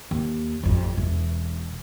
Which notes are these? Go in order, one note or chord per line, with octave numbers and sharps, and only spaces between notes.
D#2
A1 F2
E1 E3